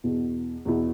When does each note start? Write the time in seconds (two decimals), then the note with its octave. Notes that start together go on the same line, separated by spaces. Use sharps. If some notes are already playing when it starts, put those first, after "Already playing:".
0.04 E2 B2 B3 E4
0.65 E2 B2 B3 E4